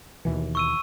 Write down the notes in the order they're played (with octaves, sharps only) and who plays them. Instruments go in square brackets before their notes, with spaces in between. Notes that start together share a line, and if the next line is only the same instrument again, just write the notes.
[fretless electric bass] D#2 B2 E3
[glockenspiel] C#6 E6 D#7